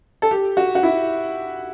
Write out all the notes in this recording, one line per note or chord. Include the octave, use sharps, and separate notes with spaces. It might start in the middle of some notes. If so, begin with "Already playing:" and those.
A4
G4
F#4
F#4
E4